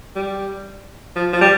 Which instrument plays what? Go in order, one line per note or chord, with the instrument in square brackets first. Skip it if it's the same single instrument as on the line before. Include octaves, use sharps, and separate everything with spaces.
[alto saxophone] G3
F3
F3
G3